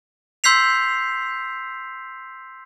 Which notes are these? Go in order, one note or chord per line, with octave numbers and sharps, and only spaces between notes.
C6 E6 G6 B6 C7 F7